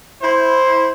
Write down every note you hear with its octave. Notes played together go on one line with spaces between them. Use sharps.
E4 C5